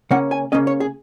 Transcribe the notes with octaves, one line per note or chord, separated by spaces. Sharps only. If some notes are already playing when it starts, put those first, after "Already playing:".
C#3 A#3 C#4 F#5
G#5
C#3 A#3 C#4 D#5
C#5
G#4